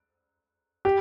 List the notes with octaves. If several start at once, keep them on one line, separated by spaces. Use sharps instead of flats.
G4